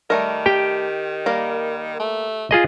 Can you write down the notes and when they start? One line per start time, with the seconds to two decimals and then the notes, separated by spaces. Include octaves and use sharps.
0.10 D#3 G3 A3 A#4
0.46 G4 G5
1.26 G3 A#3 A#4
2.00 A3
2.51 F4 G#4 D#5